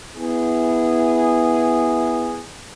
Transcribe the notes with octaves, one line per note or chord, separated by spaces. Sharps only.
B3 E4 G#4